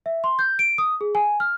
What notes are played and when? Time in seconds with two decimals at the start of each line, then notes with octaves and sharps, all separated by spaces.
0.06 E5
0.24 C6
0.39 G6
0.59 D7
0.78 D#6
1.01 G#4
1.15 G#5
1.40 F6